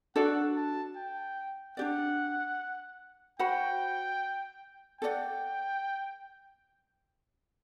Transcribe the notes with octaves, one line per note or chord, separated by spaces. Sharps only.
D4 F#4 A4 D5 F#5
A5
G5
D4 G4 D5 F#5
F#4 C5 F#5 G5 B5
A4 D5 F#5 G5